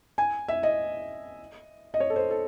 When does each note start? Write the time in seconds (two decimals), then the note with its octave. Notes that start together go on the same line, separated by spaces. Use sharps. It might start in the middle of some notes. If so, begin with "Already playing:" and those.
0.18 G#5
0.48 E5
0.63 D#5
1.94 D#5
2.00 C#5
2.10 A4
2.16 C5
2.30 A4